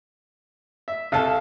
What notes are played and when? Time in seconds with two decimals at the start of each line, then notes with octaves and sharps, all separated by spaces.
0.88 E5
1.12 C2 A4 F5 A5